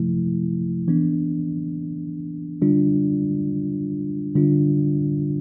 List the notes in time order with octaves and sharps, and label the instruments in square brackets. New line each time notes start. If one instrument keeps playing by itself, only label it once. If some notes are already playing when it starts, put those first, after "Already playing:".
Already playing: [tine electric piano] C3 F3 A3 E4
E3 B3 D4
D3 G3 D4 F4
D3 G3 D4 F4